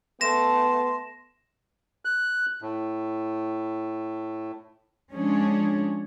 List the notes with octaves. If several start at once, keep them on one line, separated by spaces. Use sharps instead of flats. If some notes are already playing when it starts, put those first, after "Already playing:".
A3 B3 A5 C6 A#6 E7
F#6
A2
F3 G#3 C#4 D4 G#4 C#5